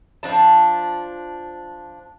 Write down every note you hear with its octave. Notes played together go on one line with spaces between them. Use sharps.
F3 D4 A5